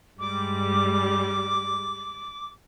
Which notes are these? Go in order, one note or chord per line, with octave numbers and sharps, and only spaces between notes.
G2 G3 G#3 D6